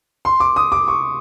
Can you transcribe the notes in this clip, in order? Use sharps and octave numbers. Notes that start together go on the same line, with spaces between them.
C6
D6
D#6
D6
C#6